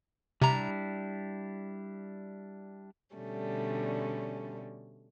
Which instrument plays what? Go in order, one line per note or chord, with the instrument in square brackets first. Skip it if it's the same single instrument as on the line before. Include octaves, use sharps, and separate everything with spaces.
[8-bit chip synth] C3 A#5 [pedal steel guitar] G3 D4 E4
[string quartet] B2 D3 G3 A3 C#4